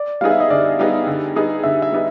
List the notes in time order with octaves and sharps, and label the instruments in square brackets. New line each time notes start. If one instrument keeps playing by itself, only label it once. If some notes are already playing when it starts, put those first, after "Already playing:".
Already playing: [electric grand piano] D5
[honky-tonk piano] G3 B3 D#4 G#4 [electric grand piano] F5
[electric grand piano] E5
D#5
[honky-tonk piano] D3 [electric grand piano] D5
[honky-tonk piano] G3 B3 D#4 G#4
D3
G3 B3 D#4 G#4
[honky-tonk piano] D3 [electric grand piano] E5
[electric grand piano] E5
[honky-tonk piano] G3 B3 D#4